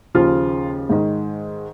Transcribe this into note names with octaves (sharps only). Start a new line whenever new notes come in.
D#2 C#3 F3 F4
G#2 D#3